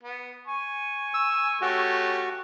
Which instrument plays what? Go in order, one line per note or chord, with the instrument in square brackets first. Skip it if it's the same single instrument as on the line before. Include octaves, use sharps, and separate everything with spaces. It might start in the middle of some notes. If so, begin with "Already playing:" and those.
[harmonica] B3
G#5 C#6
[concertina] E6
[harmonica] A3 C#4 G4 [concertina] F#4